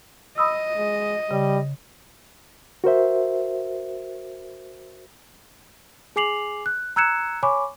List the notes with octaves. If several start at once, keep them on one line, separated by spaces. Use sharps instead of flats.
D#5 B5 D#6 E6
G#3
C#3 G3
F#4 A#4 C5 E5
G#4 G#5 D6 C7 F7 F#7
F#6
A#5 E6 F#6 G#6 C#7 E7
C#5 G#5 B5 C#6 D6